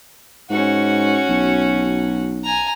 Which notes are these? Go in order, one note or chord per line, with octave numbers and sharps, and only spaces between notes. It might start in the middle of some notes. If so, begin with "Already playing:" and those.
G#2 C#4 F#4
B1
G#5 A#5